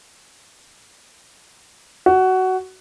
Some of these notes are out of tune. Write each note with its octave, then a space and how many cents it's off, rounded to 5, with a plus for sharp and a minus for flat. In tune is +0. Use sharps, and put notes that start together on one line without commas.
F#4 +15